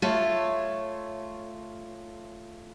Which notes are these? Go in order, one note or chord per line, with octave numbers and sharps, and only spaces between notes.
A3 F4 C#5